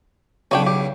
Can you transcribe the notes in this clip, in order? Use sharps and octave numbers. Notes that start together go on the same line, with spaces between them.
B1 C#3 C#4 D4 G5
G4